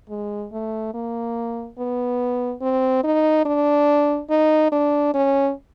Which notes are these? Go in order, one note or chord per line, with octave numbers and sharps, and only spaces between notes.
G#3
A3
A#3
B3
C4
D#4
D4
D#4
D4
C#4